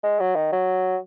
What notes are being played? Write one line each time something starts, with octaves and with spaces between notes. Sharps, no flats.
G#3
F#3
D#3
F#3